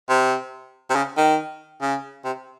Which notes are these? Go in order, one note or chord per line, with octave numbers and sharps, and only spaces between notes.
C3
C3
C#3
D#3
C#3
C3